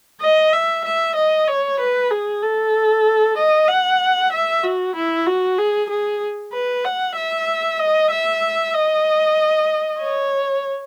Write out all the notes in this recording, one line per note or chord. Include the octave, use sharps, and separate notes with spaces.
D#5
E5
E5
D#5
C#5
B4
G#4
A4
D#5
F#5
E5
F#4
E4
F#4
G#4
G#4
B4
F#5
E5
D#5
E5
D#5
C#5